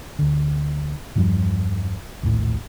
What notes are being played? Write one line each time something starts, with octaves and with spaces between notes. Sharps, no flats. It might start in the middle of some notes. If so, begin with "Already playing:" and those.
D2 D3
E2 G2 F3 G3
A#1 D#2 A2